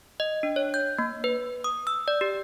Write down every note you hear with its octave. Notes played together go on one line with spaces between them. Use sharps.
D#5
D4
C#5
G6
A#3
B4
D#6
E6
D5
G4